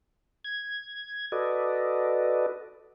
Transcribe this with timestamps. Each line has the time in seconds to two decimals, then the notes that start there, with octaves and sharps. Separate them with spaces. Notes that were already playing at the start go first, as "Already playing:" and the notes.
0.44 G#6
1.32 F#4 A4 B4 D5 D#5